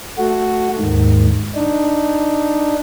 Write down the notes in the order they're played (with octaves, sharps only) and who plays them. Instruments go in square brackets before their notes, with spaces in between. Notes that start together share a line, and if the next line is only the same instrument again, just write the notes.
[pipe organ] A3 F#4
D#2 G#2 D#3
D4 D#4